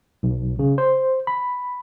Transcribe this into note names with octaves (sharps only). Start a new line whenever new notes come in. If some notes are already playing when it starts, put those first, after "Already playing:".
B1
C#3
C5
B5